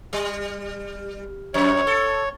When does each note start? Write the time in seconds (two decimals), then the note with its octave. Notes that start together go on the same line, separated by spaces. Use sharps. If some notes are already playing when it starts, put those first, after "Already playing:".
0.13 G3
1.54 F2 C#5
1.87 A4